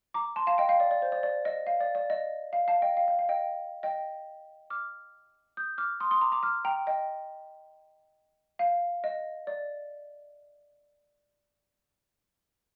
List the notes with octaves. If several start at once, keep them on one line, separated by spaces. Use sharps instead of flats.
A#5 D6
A5 C6
F5 A5
D#5 G5
F5
D5
D5
C5
D5
D5
D#5
F5
D5
D5
D#5
F5
F5 A5
D#5 G5
F5
F5
F5
D#5 G5
D#5 G5
D6 F6
D#6 G6
D6 F6
C6 D#6
C6 D#6
A#5 D6
A#5 D6
D6 F6
G5 A#5
D#5 G5
F5
D#5
D5